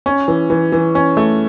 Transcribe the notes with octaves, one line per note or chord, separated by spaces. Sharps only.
C#4
E3
E3
E3
C#4
A3